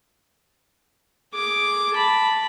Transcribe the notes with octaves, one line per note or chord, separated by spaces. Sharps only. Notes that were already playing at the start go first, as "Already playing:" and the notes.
G#4 D6
A5 B5